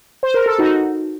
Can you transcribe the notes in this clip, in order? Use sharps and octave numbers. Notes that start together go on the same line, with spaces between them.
C5
A#4
A4
D#4 F#4